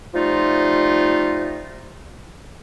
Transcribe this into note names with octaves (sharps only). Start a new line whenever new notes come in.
F3 G3 A3 D#4 F4